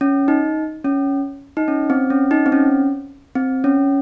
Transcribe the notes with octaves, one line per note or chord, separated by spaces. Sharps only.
C#4
D#4
C#4
D#4
C#4
C4
C#4
D#4
C4
C#4
C4
C#4